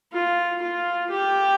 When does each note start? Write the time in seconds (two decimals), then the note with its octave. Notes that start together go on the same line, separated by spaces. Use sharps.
0.13 F4
0.62 F4
1.10 G4